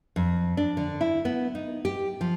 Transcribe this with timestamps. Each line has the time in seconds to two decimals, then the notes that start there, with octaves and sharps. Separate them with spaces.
0.16 F2
0.57 D4
0.77 D3
1.01 E4
1.25 B3
1.55 D#4
1.85 G4
2.21 F3